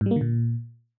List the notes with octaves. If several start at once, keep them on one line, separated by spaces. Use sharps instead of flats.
G#2
G3
A#3
D3
A#2